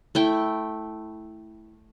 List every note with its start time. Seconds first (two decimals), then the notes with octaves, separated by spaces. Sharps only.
0.15 A3 E4 G5